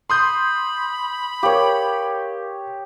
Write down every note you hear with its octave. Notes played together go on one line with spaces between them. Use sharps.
B5 C6 D#6 G6
G4 A#4 C#5 F5